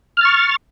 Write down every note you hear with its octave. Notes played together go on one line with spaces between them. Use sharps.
C#6 F6 A6